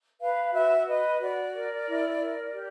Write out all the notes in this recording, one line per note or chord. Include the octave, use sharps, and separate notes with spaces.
B4 F5
F#4 E5
B4 D#5
F#4 D5
A#4
E4
A#4
G4